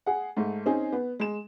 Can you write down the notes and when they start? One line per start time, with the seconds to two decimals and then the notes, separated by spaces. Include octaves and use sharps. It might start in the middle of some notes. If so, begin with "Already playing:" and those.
0.06 G#4 F#5
0.37 G#2 A3
0.66 C4 C#4 D#4 G#4
0.92 B3
1.20 G#3 E7